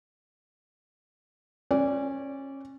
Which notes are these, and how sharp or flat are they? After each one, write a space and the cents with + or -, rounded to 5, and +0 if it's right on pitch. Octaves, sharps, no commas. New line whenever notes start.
C#4 -25 D5 -20